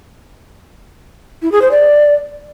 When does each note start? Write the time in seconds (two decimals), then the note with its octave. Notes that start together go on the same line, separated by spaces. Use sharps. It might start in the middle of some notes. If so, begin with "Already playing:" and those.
1.42 E4
1.52 G#4
1.62 C5
1.71 D5